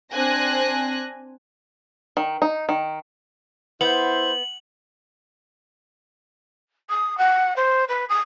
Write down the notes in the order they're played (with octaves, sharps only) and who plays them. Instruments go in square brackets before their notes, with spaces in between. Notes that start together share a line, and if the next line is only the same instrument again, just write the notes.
[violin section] C4 D4 G#5 F#6 A#6
[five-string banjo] D#3
D#4
D#3
[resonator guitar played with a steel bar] B3 [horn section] E4 C5 [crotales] F#7
[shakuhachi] D#6
F#5
C5
B4
D#6